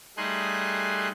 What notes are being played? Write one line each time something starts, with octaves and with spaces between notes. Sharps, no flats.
G3 A3 D#4 G#4 C6 F#6